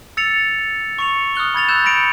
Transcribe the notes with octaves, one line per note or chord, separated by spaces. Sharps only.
E6 A6 C#7 F7
C#6 C#7 F7
D#6 F6 F#6 G7
B5 G#6 A6 F7
E6 F#6 G6 E7
B5 G6 A#6 C#7 D7 F7